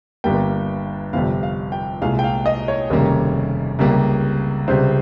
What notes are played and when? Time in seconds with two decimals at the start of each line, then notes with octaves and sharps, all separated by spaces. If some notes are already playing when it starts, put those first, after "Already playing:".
0.24 G1 G2 G3 A#3 G5
1.13 G1 F2 C3 G3 F5
1.43 F5
1.72 G5
2.02 C2 A#2 G#3 F5
2.19 G5
2.24 F5
2.46 D#5
2.68 C#5
2.90 F1 D#2 C#3 G3 A#3
3.79 C#2 C3 G3 A#3
4.68 C#2 C3 G3 C5